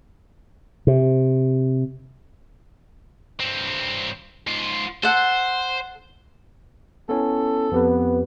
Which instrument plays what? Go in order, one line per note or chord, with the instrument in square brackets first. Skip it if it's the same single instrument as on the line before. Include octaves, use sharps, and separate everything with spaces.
[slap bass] C3
[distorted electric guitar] G2 C4
G#2 F4
[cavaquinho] A4 F#5 [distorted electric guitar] C5
[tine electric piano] B3 C#4 E4 [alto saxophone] A4
[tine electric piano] F2 G4 B4 [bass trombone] B3